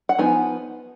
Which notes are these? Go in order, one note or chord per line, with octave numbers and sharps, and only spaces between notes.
F#5
F3 B3 D#4 G#5